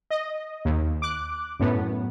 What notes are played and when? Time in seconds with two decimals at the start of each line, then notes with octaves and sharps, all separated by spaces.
0.11 D#5
0.65 D#2
1.02 D6 F#6
1.60 F#2 A2 B3